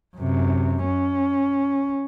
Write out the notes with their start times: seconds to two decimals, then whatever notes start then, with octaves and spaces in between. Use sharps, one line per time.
0.16 F#2 C3
0.86 C#4